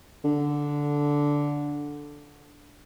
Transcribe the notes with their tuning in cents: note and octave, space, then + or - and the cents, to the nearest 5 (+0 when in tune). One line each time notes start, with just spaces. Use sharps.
D3 -5